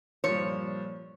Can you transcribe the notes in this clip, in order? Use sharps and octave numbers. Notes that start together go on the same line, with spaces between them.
G2 A#2 F3 C#5